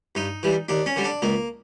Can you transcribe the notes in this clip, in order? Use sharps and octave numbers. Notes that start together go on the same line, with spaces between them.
G2 D#4
E3 G3
D#2 D4
C#4
D3 G3
D4
C#2 A#3